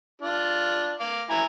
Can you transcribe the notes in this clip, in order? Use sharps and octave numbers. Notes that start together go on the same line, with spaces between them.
D4 F4
F5 D6
E4 G#5 A#5